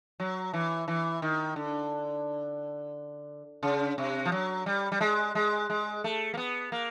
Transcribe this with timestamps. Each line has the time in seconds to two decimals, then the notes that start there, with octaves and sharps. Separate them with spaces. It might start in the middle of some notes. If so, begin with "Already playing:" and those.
0.20 F#3
0.53 E3
0.88 E3
1.22 D#3
1.56 D3
3.63 C#3
3.98 C3
4.25 F3
4.32 F#3
4.66 G3
4.92 G3
5.01 G#3
5.35 G#3
5.70 G#3
6.04 A3
6.34 A#3
6.37 B3
6.72 A#3